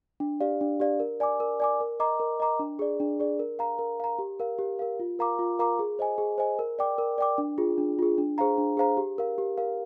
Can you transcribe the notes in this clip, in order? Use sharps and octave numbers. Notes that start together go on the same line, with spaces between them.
D4
G4 D5 F5
D4
G4 D5 F5
A#4
D5 G#5 D6
A#4
D5 G#5 D6
A#4
D#5 A#5 D6
A#4
D#5 A#5 D6
D4
G#4 D5
D4
G#4 D5
A#4
F5 A#5
A#4
F5 A#5
G4
A#4 F5
G4
A#4 F5
F4
A#4 F5 A#5 D6
F4
A#4 F5 A#5 D6
G#4
C5 D#5 G#5
G#4
C5 D#5 G#5
A#4
D5 G5 D6
A#4
D5 G5 D6
D4
F4 G#4
D4
F4 G#4
D4
G#4 C5 F5 A#5
D4
G#4 C5 F5 A#5
G4
A#4 F5
G4
A#4 F5